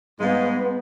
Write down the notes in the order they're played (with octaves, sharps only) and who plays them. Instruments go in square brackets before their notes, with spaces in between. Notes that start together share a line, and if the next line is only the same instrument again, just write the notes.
[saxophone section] G#2 G#3 [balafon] G3 F5 [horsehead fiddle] B3